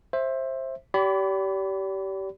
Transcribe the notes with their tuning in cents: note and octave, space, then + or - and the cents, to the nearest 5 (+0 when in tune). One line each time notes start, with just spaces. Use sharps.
C5 +20 E5 +0
G4 -25 D5 -40 B5 +20